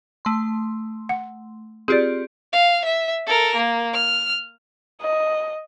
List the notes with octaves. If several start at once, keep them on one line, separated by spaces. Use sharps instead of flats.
A3 C6
F#5
C4 F4 G4 G#4 D5
F5
E5
A4 A#4
A#3
F6
D#5